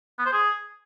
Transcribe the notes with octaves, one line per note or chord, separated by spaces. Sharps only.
B3
C5
G#4